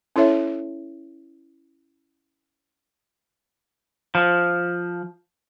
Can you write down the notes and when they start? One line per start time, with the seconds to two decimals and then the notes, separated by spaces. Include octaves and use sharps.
0.16 C#4 E4 A4 C#5 E5
4.15 F3